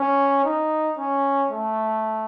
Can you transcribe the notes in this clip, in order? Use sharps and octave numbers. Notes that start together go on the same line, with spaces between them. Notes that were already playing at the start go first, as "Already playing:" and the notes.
Already playing: C#4
D#4
C#4
A3